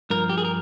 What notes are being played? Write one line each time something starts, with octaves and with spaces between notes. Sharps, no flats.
G2 F3 A#4
G4
G#4
A#4